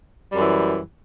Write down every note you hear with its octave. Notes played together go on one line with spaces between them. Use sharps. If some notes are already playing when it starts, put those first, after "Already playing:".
F#2 E3 G3